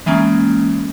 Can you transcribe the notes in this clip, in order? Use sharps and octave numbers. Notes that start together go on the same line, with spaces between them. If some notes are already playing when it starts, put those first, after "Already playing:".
E3 G#3 A#3 C#4